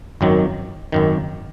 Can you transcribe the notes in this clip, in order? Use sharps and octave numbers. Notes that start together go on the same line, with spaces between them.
G#1 F#2 D#3 F#3
G#1 F#2 D#3